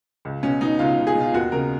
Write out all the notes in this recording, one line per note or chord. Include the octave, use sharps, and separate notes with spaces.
C#2
B2 C#4
B2 D#4
C#2 F4
C#2
G#4
B2
F4
D#2 F#4
C#3 A#4